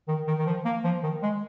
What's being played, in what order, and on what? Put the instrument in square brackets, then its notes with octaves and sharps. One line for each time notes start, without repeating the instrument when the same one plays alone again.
[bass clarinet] D#3
D#3
D#3
F3
A#3
F3
D#3
G#3